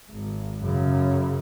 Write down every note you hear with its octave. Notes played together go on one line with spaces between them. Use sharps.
G#1
F#2 C#3